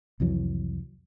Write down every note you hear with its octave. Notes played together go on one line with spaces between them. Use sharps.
C2 F2 E3 F#3